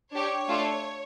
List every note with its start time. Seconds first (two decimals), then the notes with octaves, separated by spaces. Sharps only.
0.13 D4 G4 C#5
0.48 A3 D4 F4 A4